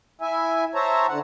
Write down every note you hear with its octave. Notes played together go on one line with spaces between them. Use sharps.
E4 E5 G#5
C5 C#5 E5 A5 A#5
D3 F#5